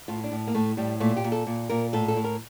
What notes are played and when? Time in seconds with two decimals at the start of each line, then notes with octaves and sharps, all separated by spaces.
0.08 A2 F4
0.24 D4
0.32 A2
0.47 A#3
0.54 A2 A3
0.77 A2 G3
1.00 A#2 A3
1.17 G4
1.24 A#2
1.32 A4
1.47 A#2
1.69 A#2 A#4
1.93 A2 A4
2.08 A4
2.16 A2
2.24 A#4